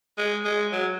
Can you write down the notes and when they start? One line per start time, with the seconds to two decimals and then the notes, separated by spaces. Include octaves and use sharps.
0.18 G#3
0.45 G#3
0.72 F#3